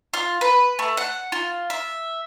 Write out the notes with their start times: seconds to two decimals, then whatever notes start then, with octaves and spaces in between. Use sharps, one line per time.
0.14 F4
0.41 B4
0.79 A3
0.97 F#5
1.32 F4
1.70 E5